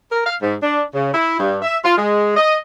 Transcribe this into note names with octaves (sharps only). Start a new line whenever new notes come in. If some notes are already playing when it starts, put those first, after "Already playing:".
A#4
F5
G#2
D4
C#3
E4
G2
E5
F4
G#3
D#5